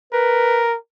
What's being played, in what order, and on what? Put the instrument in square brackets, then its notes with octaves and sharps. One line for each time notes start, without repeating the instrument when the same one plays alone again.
[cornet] A#4 [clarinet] B4